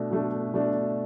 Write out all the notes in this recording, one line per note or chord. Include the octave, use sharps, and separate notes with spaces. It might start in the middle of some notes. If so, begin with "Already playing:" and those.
Already playing: B2 A3 D4
B2 A3 D4
B2 A3 D4